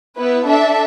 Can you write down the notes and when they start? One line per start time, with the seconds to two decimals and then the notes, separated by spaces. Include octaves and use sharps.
0.17 B3 E4 B4
0.47 D4 A4 E5 A5